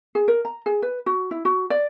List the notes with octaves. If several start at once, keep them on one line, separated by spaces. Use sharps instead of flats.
G#4
A#4
A#5
G#4
B4
F#4
E4
F#4
D5